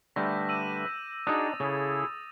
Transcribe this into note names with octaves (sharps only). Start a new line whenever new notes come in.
D3 G3 A3 B4 E5 G6 A#6
D6 E6 D#7
D4 D#4 F#4 G#4 D5 D#6 A6
C#3 E4 G#4 A4